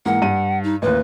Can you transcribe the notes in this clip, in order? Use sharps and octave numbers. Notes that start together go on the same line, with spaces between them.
G#2 E3 A#3 F#5
G2 D#7
D#4
A1 D#2 B4